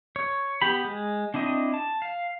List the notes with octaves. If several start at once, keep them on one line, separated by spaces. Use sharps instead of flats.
C#5
B3 G4 B5
G#3
C4 D4 E4 D#5
A5
F5